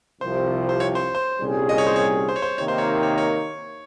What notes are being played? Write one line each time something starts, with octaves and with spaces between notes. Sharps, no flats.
C2 C3 F3 C5
C5
C#5
C5
C5
C2 A#2 G3 C#4 G#4
D#5
C#5
C5
C#5
C5
C#5
C5
C3 D#3 A#3 D#4 C#5
C5
C#5
C#5
C#5